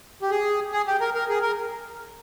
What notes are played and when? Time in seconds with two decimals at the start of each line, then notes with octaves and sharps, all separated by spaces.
0.22 G4
0.31 G#4
0.72 G#4
0.87 G4
1.00 A#4
1.15 A#4
1.29 G#4
1.42 A#4